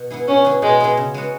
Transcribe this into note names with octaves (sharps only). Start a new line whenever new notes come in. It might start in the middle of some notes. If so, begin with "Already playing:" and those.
Already playing: B2
B3 E4 G#4
B2 C#4
B3 E4 G#4
B2 G#3
B3 E4 G#4
C#3
G#3 B3 F#4